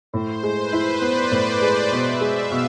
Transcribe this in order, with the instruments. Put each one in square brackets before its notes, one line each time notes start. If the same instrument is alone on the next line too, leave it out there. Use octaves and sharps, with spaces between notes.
[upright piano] A2 [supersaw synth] C5
[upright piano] G#3
[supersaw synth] B4
[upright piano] E4
[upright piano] B3 [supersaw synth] D5
[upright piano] A2
G#3
[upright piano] B2 [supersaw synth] E5
[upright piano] G#3
[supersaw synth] F5
[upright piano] B2